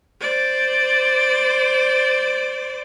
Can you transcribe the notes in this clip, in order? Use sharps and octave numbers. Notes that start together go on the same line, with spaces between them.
C5 D5